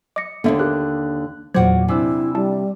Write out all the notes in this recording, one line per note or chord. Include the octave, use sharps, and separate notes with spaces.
D#5 D6 A#6 C#7
D#2 G#2 D3 A#3 B3 E5
G4 A#4 F#6
E2 A#2 F#3 F4 F#4 C5 D5 G#6
C3 D4 E4 G#5 D6 E6
G3 E4 A5